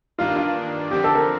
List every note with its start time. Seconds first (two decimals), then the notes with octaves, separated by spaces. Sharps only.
0.18 G2 D#3 A#3 D4 F4
0.36 F4
0.91 D3 F3 C4 G4
1.04 A4
1.15 A#4